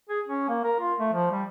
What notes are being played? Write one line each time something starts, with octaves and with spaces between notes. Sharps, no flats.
G#4
C#4
A#3
A#4
F4
A3
F3
G3